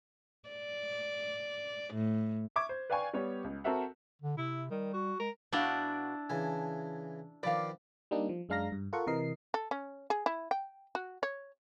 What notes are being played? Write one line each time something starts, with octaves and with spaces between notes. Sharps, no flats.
D5
A2
E5 C#6 D6 G#6
C5
B4 D5 F5 G5 G#5 C#6
G3 B3 G4 C#5
C#2
C4 F#4 A4 A#4 E5 F#5
D3
C3 E4
D#3 G3
F#4
G#3 A#4
B2 D4 E4 F#4 F5 G5
C#3 E3 G#5 A5
D#3 F3 B4 D5 F5
G3 A#3 D4 D#4
F3
F#2 G#3 D4 F5 A#5 A#6
G2
F4 A4 A#4 F#5 C#6
C3 E3 A#4 D#5 C7
A4
C#4
G#4
E4
G5
F#4
C#5